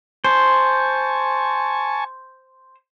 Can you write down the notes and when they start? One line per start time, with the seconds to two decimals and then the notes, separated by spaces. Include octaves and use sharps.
0.24 C5 G#5 A5 C#6